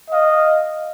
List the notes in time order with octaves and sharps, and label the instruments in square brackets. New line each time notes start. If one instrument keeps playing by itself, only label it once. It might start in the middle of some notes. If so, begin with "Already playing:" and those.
[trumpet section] D#5 F5